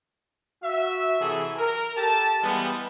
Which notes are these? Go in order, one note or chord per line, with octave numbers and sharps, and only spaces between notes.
F#4 E5
C3 E3 F#3 G#4 A4
A#4
G4 A4 A5
E3 G3 G#3 B3